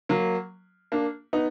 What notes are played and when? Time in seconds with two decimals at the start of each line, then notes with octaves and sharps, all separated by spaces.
0.09 F#3 A#3
0.92 A#3 D4
1.33 B3 D#4